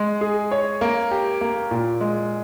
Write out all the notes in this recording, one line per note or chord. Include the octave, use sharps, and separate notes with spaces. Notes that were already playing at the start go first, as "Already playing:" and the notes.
Already playing: G#3
G#4
C#5
A#3
G4
A#3
A#2
G#3